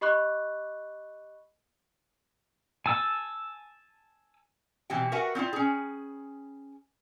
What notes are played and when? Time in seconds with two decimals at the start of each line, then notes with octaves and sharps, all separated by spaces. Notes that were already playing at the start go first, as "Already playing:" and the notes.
0.01 G4 D#5 B5 C#6 D6 F#6
2.86 G#5 A5 E6
4.90 B2 E3 C4 G4 G5
5.12 F#4 A#4 B4 E5 F#5 G#5
5.35 C4 C#4 E4 F4
5.53 C#4 G#4